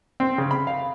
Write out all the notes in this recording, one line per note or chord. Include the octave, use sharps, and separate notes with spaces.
C4
C#3
B5
F5